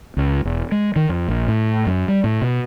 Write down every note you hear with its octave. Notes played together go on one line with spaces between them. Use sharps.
C#2
E1
G#3
D#3
F2
A#1
A2
F#2
G3
A2
B2